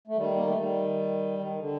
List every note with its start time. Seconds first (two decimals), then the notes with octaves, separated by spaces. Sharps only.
0.07 A3
0.17 D#3 G3
0.36 A#3
0.47 A3
0.58 D#3 G3
1.39 D#3
1.59 D3